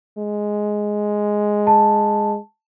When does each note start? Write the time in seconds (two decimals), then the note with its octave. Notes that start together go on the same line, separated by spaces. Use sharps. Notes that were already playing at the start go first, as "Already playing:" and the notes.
0.18 G#3
1.67 A5